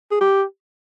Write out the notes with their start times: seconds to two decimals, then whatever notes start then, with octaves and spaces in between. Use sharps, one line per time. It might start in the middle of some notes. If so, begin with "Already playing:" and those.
0.12 G#4
0.21 G4